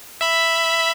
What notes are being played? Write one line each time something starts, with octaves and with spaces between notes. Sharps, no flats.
E5 B5